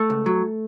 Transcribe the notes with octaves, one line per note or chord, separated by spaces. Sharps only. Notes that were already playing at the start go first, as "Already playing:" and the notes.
Already playing: A3
C#2
F#3